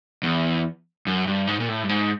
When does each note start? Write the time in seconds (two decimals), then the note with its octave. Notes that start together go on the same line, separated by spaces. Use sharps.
0.23 E2
1.07 F#2
1.27 G2
1.47 G#2
1.60 A#2
1.69 A2
1.83 G2
1.89 G#2